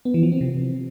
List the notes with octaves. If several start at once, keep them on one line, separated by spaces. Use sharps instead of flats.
B3
E3
F3
C4
C3